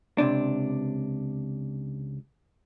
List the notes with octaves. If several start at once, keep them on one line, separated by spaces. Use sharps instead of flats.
C#2 C3 D4